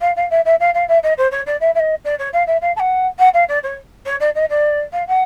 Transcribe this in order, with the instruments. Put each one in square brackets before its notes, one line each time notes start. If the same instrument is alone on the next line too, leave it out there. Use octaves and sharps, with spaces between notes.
[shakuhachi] F5
F5
E5
E5
F5
F5
E5
D#5
C5
C#5
D5
E5
E5
D#5
D5
C#5
F5
E5
F5
A5
F#5
F#5
F5
D5
C#5
C#5
D5
D#5
D5
F5
F#5